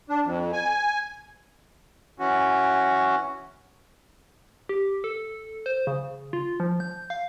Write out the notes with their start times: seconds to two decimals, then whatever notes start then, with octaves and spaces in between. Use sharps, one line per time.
0.09 D4
0.24 F2
0.53 G#5
2.19 E3 C#4 F#4
4.69 G4
5.04 A4
5.66 C5
5.87 C#3
6.33 F4
6.60 F3
6.80 G6
7.10 F5